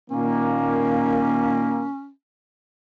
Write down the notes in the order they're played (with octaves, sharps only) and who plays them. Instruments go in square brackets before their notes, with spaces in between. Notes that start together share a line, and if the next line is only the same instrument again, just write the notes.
[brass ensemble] A#2 D#3 A#3 [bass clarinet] C#4